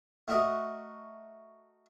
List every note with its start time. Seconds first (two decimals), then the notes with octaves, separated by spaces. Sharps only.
0.28 A3 F#4 A#4 D#5